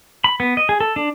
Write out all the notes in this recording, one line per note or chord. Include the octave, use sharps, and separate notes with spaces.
B5
B3
D#5
G#4
A4
D4